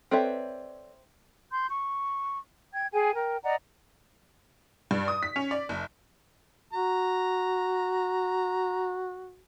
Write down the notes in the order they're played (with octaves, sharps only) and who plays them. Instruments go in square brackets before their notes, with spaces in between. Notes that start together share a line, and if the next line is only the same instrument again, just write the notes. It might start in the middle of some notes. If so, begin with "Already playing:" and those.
[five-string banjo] C4 B4 E5 [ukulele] A4 C#5 D5
[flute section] C6 G6
C#6
G5 G#6
G#4 G5 G#5
A#4 G5
D5 D#5 F#5 A#5
[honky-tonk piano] G2
D#6
B6
C#4
D5
F#1
[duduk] F#4 [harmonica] A#5